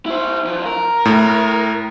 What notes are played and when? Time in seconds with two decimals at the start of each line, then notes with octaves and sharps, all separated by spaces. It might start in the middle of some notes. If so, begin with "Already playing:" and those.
0.06 E4 C5
0.45 E2 F3
0.65 A#4
1.05 A2